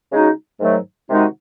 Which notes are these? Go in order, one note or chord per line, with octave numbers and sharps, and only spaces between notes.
C#3 G#3 D#4 F#4
G#2 D#3 F#3 A3
C3 D#3 G#3 D#4 F#4